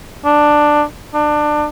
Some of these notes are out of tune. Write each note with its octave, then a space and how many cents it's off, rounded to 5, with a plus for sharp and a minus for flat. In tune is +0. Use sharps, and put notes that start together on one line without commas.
D4 +10
D4 +25